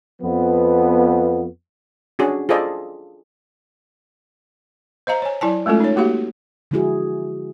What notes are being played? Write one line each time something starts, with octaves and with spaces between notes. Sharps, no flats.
F2 F3 B3
C#4 D4 F#4 G#4
F4 G#4 A4 C5 D5 D#5
C5 D#5 F5 A#5
C#5 G#5
F#3 E4 G#5 A5
G#3 A3 C#4 F4 A4
D#4 C#5
A#3 F#4 G4 F5
D3 F3 G#3 E4 F#4 G#4